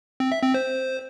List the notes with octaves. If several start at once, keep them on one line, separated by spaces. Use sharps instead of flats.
C4
E5
C4
C5